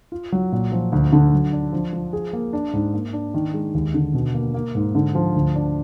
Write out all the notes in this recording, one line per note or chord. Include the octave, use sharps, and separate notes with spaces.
F4
F#3
A#2
F3
D2
D3
F#3
D4
F3
F3
G#4
A#3
D4
G#2
A#3
D4
D#3
G#3
D#2
D3
B2
A#3
A#3
G#2
D3
F3
D2
D4